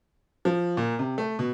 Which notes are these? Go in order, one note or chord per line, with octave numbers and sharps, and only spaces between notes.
F3
A#2
C3
A3
B2